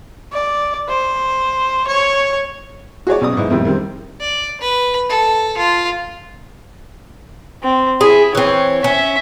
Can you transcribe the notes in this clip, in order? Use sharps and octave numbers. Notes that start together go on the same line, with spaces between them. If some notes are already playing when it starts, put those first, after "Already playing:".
D5
C5
C#5
F#4 G#4 C#5 D5
B1 C#3 D5 D#6
G#2 B3 E4
F2 A2 D#3 G3 C4 E4
D#3 G3 C4
D5
B4
A4
F4
C4
E4 G#4
E3 C4 C#5
C#4 E5